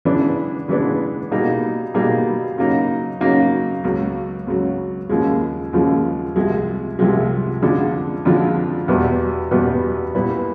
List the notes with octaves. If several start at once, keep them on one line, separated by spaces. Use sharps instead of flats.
C#3 E3 G#3 B3 D4
C#3 E3 G#3 B3 D4
B2 G3 A#3 D#4 G#4
B2 G3 A#3 D#4 G#4
C#3 F#3 A#3 D#4
C#3 F#3 A#3 D#4
C#2 C#3 F#3
C#2 C#3 F#3
D#2 C#3 F3 G#3
D#2 C#3 F3 G#3
C2 C3 F3 G#3
C2 C3 F3 G#3
F2 D3 F3 G#3
F2 D3 F3 G#3
E2 B2 G3 B3
E2 B2 G3 B3
A#2 G3 B3 E4